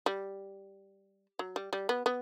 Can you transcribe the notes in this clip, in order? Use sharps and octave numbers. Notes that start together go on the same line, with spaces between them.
G3
F#3
G3
G3
B3
B3